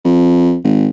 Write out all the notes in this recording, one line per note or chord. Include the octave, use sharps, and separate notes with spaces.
F2
G#1